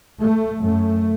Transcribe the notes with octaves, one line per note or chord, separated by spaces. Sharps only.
A3
F#2 A3